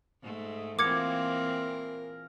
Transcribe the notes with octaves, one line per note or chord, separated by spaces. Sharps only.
G#2 A3
A#2 E3 C4 G#4 A#4 D6 G#6 C#7